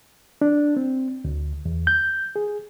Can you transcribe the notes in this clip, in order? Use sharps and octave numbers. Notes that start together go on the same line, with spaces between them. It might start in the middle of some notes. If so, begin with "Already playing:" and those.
D4
C4
D2
E2
G6
G#4